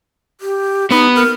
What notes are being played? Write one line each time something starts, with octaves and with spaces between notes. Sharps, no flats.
G4
B3 D#4 B4
A#4